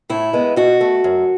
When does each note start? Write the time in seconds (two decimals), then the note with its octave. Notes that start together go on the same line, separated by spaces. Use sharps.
0.09 A2 E4
0.33 G#3 B3
0.56 B2 F#4
0.81 A3
1.04 F#2